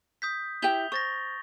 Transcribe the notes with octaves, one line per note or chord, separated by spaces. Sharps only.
D#6 G6 B6
E4 G4 G5 G6 F7 G7
C5 C#6 A6 A#6